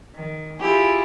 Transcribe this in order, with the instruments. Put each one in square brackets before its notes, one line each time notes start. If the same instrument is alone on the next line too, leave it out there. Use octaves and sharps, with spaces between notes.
[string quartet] D#3
E4 F4 G4 G#4